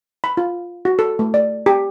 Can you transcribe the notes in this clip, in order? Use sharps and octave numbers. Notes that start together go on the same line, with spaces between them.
B5
F4
F#4
A4
A3
D5
G4